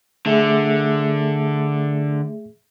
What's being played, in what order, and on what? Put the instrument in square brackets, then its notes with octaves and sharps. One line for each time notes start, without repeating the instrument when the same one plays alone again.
[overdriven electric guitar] D3 [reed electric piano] A3 G#4 E5